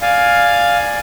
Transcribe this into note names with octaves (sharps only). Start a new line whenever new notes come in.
D5 F5 G#5